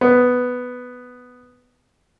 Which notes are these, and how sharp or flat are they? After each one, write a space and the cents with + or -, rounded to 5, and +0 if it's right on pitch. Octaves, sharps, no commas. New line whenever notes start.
B3 +5